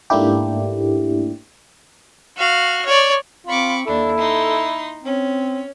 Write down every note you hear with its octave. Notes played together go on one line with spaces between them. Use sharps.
G#2 A3 A#3 D4 E4 G4
F#4 F5
C#5 D5
C4 F4 B5 C#6 D6
D#2 D4 E4 A4
D#4 C6
C4 C#4